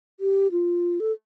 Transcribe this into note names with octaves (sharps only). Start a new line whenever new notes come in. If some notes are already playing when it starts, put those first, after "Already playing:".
G4
F4
A4